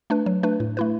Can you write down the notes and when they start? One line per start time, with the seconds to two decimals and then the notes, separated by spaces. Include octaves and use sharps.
0.10 A3 D4 B4
0.26 F#3
0.43 A3 D4 B4
0.60 A2
0.77 A3 E4 B4